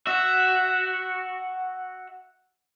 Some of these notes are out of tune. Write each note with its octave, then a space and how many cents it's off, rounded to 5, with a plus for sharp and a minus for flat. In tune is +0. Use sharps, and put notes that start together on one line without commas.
F#4 +0 E5 +0